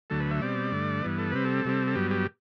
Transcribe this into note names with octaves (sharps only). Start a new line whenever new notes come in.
D2 D3 F#3 A3 A4
B4
E5
B2 G3 C4 D5
G2 D3 A3
G2 E3 B3
A4
C3 G3 C4 B4
A4
C3 G3 C4
A4
G2 F#3 B3 G4
G4